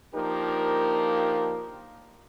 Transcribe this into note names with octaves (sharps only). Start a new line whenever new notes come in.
F3 A#3 D4 D#4 G4 A#4